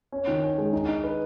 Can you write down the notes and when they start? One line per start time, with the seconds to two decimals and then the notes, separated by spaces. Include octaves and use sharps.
0.12 C#4
0.27 D#3
0.43 C#4
0.58 G#3
0.73 D#4
0.88 D#4
1.04 B4